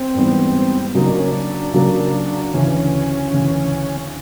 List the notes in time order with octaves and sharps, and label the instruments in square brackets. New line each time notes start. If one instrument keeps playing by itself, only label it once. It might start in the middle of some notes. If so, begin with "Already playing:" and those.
Already playing: [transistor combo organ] C4
[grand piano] G#2 E3 G3 B3
[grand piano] C#3 F#3 A#3 [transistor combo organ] D#4
[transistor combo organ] D4
C#4
D4
[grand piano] C#3 F#3 A#3
[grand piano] D2 C#3 E3 [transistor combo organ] C#4
[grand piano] D2 C#3 E3